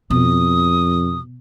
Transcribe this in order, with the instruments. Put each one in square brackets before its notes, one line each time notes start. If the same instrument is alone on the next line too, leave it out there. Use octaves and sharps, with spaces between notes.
[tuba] F2 [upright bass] B2 [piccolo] D#6